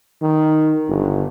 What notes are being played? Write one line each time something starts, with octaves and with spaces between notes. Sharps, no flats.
D#3
G1